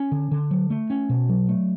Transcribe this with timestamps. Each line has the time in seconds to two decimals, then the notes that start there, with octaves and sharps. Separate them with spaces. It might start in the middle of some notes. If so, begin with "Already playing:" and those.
Already playing: C#4
0.12 D3
0.31 D3
0.51 F#3
0.70 A3
0.90 C#4
1.09 B2
1.29 F#3
1.49 A3